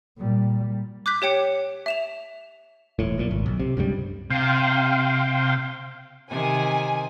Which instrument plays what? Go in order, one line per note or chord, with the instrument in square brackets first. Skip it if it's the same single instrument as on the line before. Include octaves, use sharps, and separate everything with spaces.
[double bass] A#2 G3
[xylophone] D6 F#6 G6 B6
G4 C#5 G5 C#7
E5 E7 F7
[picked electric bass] E1 A2
B1 A#2
G#1
B1
C3
C#2 G2 B2 G3
[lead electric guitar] C3 [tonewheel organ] F5 G5 C6
[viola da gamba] C3 D#3 [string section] G#5